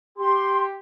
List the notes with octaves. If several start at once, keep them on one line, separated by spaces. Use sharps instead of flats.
G4 C6